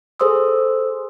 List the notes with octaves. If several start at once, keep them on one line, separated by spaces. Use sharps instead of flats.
G#4 A4 C5 C6 D#6 E6